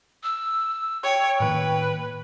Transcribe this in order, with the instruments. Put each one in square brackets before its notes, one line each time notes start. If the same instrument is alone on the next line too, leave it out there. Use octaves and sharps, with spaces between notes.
[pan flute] E6
[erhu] C#5 [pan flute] G5
[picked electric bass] A2 D#3 A#3 [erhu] B4